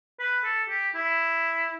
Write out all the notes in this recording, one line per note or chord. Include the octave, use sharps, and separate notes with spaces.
B4
A4
G4
E4